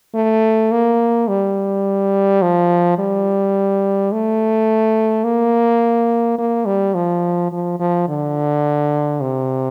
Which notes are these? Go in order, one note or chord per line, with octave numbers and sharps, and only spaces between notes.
A3
A#3
G3
F3
G3
A3
A#3
A#3
G3
F3
F3
F3
D3
C3